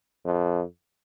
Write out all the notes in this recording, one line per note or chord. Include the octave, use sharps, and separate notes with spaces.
F2